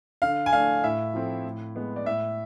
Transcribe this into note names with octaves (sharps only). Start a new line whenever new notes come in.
D3 F5
G#5
A3 D4 F5
A2 E5
F3 A3 C4 E4
A2
G#3 B3
D5
A2 E5